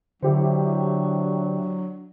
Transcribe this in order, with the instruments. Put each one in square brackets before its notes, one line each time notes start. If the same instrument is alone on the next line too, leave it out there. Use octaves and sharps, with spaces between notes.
[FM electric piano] D3 [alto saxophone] F#3 [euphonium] D4 [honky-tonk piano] E4 G4 C5